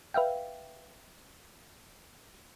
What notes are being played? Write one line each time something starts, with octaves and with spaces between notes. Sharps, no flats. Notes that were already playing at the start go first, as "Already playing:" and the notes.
B4 E5 F5 G5